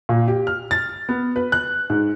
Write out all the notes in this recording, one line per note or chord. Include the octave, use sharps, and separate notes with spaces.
A#2
G4
F6
A6
B3
B4
F#6
G#2